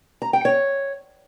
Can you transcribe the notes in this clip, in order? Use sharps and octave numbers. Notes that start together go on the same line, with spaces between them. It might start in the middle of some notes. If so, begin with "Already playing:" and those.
A#5
G5
C#5